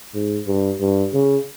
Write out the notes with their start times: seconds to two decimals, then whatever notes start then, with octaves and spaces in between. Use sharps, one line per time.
0.15 G#2
0.47 G2
0.81 G2
1.14 C#3